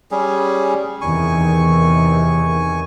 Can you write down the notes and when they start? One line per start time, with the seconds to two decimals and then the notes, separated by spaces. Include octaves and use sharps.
0.11 G3 C#4 G#4
1.01 E2 C3 D#3 G#5 C#6